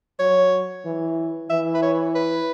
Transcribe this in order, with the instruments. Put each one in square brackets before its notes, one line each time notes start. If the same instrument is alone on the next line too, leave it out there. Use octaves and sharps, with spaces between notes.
[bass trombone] F#3 [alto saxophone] C#5
[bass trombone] E3
[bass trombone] E3 [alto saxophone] E5
[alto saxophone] B4
C#5
B4